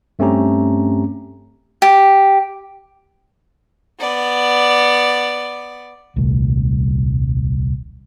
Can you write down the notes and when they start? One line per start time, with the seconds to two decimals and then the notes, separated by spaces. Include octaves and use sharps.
0.19 G2 A3 C4 C#4 G4 A#5
1.82 G4
4.00 B3 D5
6.16 D#1 C2 A3